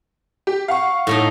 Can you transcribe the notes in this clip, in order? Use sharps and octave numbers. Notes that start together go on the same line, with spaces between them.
G4
F5 F#5 C#6
A2 A3 D#4